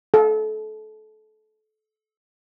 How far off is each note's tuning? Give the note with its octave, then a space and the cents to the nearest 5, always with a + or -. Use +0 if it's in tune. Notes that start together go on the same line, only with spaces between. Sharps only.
A4 -30